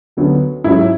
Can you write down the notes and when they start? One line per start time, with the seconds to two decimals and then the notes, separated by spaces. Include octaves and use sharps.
0.17 D2 D3 F#3 B3
0.64 G#2 F#3 C#4 E4